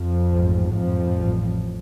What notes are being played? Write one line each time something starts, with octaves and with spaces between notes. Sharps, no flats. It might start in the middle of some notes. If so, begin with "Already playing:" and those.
Already playing: F2 F3
A1 G#2
F2 F3
A1 G2